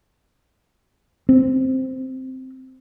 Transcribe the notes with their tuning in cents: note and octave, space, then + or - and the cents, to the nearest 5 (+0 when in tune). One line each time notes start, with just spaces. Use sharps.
C4 -5